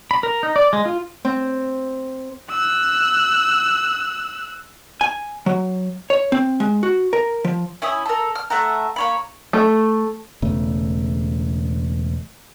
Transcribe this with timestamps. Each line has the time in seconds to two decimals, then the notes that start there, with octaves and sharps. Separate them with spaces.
0.11 B5
0.23 A#4
0.43 D#4
0.56 D5
0.73 G#3
0.86 F4
1.25 C4
2.51 E6 F#6
5.01 G#5
5.46 F#3
6.10 C#5
6.32 C4
6.60 G#3
6.83 F#4
7.13 A#4
7.45 F3
7.82 C#4 E4 G#5 D#6
8.06 A4 A#4
8.35 F6
8.50 A3 E5 F#5 A#5
8.96 A#3 C#5 B5
9.53 A3
10.42 E1 C#3 A3